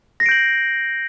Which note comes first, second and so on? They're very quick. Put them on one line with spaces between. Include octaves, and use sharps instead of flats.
A#6 C7 D7 G6 F#7